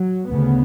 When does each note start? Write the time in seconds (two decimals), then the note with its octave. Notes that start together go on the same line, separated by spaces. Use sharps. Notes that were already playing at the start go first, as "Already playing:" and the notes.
Already playing: F#3
0.31 D2 C#3 B3